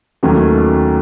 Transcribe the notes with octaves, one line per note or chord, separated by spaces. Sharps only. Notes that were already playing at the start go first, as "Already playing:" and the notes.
D#2 D#3 F#3 A3 C#4